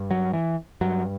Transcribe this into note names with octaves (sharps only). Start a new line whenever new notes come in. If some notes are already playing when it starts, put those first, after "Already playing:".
Already playing: G2
F#3
E3
G2 F#3